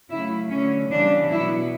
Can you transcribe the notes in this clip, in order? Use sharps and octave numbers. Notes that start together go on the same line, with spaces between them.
C#3 F#3 A3 E4
D3 F#3 A3 C#4
C#3 E3 G3 B3 D4
B2 F#3 B3 E4